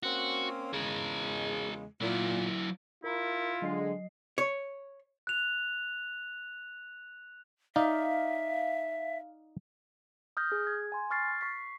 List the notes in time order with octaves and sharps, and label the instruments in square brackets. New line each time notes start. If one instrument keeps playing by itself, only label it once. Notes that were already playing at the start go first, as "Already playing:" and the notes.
[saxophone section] A#3 C4 C#4 [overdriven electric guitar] F#4
[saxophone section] E2 C#3 G#3 [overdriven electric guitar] G#4 A#4
[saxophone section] A#2 [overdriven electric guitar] F#3 E4
[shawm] E4 [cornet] F4 [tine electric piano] A#4 A#5 B5
[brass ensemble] D3 G#3 [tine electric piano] F#3 D#5 C7
[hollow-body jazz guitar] C#5
[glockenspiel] F#6 F7
[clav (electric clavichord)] D#4 D5 [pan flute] E5 [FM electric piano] F5
[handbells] D#6 F6 G6 A#6
G#4
G#6
G#5 C6
C#6 F6 A6 C7
C#6 B6 C7